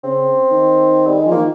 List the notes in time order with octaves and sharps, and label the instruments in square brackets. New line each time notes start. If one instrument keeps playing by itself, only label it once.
[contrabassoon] C#3 [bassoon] C4
[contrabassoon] D#3
[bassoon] G3
G#3
[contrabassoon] F3
[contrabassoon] D#3 [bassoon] A#3